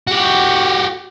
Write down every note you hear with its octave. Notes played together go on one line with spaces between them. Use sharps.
F#4 G4